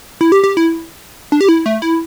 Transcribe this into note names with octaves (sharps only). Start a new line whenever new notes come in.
E4
G4
G4
E4
D4
G4
E4
A3
E4